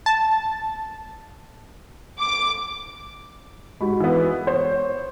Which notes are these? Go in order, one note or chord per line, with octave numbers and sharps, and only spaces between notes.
A5
D6
G#2 F#4 B5
E3 B3
C5 C#5